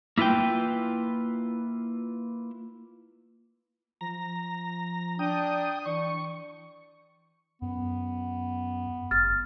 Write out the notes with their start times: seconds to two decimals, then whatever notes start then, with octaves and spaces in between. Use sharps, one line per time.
0.18 A#3 E4 F4 B4 G5
4.01 F3 A#5
5.19 D4 G5 D#6
5.86 E3 C#6
7.62 F#2 B3
9.11 G1 F6 A6